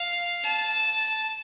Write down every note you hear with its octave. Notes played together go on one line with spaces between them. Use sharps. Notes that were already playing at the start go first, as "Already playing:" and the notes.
Already playing: F5
A5